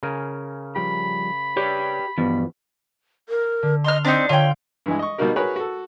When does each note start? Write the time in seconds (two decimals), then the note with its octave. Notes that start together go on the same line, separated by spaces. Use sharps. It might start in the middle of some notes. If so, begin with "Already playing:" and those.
0.03 C#3 A#4 G#5
0.76 F3 G3 G4 B5
1.57 G4 B4 C#5 D5
2.18 G2 B2 E3 F3 B3
3.29 A#4
3.63 D3
3.84 D#5 C6 F6
4.05 C4 D4 D#4 D#5 B6
4.29 D3 F4 C#5 G5
4.86 G2 E3 G#3
4.99 D#5 C#6
5.18 B2 G3 A#3 D#4 F#4 A#4
5.36 F#4 G#4 A#4 B4 C#5
5.56 F#4 A4